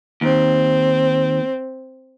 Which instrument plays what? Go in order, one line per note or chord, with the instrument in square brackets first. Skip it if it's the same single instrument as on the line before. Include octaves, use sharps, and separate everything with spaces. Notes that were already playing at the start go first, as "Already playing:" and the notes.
[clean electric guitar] D#2 [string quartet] C4